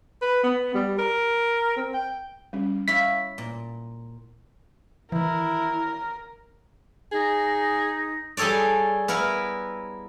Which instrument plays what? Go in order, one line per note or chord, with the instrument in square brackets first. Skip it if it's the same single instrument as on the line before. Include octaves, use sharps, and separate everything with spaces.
[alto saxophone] B4
B3
G3
A#4
C4
G5
[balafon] G3 C#4
[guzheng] E4 C#5 F5 [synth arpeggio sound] B6
[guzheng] A#2
[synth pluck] D#3 E3 [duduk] E4 [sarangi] A#4
[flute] D#4 [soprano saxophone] G#4
[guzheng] G3 G#4 A4 C#5 D5
B3 E4 A#4